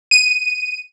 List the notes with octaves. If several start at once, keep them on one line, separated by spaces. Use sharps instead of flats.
D#7